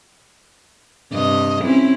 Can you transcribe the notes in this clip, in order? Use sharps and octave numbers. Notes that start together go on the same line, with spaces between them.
G2 C3 D#5
C4 C#4 E4